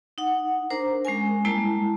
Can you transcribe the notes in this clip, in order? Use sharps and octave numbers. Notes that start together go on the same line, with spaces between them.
D#4 F#5
D4 A#4 C5 A#5
G#3 C#4 A#4 G#5
G3 G#3 A#3 E4 A5